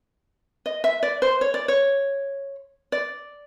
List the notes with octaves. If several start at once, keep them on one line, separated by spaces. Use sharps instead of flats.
D#5
E5
D5
C5
C#5
D5
C#5
D5